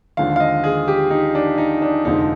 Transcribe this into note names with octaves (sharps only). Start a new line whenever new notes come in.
D#2 D3 F3 G#3 F5
F5
D#5
G#4
G4
D#4
D4
D#4
D4
F1 F2 D3 F3 G#3 D#4